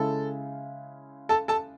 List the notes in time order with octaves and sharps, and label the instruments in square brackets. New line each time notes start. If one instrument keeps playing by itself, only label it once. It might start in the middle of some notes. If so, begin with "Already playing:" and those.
Already playing: [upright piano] C#3 G#3 C#4 E4 [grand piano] A4
[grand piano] A4 A5
A4 A5